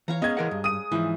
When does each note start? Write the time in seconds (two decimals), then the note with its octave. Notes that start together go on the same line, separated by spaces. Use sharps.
0.08 E3 C#5 F5 A#5
0.22 G#3 B3 C#4 D#5 G#6
0.37 E3 A#4 F#5
0.51 G2
0.64 D#6 D#7
0.92 G#2 E3 F3